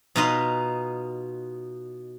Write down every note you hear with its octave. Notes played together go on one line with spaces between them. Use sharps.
B2 D#4 F4 B4 D#5 C6